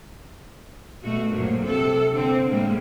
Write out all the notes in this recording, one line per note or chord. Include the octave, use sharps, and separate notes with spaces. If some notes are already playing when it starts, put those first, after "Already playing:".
B2 A3 F#4
G2 A#2 F3 F#3
C3 A4
D3 C4
A2 G3 G#3 A#3